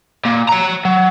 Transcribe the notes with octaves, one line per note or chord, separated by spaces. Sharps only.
A#2
C#5 A#5
F#3